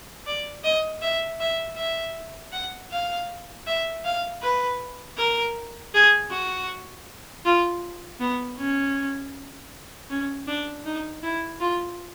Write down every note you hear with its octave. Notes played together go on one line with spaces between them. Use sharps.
D5
D#5
E5
E5
E5
F#5
F5
E5
F5
B4
A#4
G#4
F#4
F4
B3
C#4
C#4
D4
D#4
E4
F4